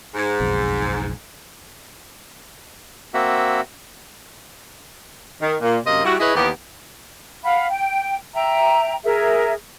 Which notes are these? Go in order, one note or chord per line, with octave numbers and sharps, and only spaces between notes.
G#2
F#1 B1 F2
A#3 C4 F#4 E5
D#3
A#2
F#2 C3 A#3 C5 D#5
G3 E4 F#4
E4 G#4 B4 C#5 D#5
D#2 E3 B3 G4
F5 F#5 B5
G5
E5 G5 A#5
G#4 A#4 E5